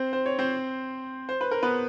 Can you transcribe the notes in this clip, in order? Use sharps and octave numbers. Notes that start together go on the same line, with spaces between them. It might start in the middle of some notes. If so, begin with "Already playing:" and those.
Already playing: C4 C5
C5
C#5
C4 C5
C5
B4
A#4
B3 B4